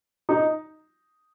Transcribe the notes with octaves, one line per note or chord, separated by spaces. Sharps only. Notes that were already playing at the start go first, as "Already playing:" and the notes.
D#4